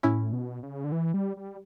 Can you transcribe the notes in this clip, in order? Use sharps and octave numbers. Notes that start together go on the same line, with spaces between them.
A2 C#4 E4
B2
C#3
D3
E3
G3
G3